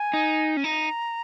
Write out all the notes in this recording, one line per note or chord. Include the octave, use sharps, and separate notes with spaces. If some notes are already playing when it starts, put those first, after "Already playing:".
Already playing: G#5
D#4
C#4
D#4 A#5